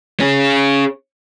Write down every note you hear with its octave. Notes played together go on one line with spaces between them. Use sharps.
C#4 G#4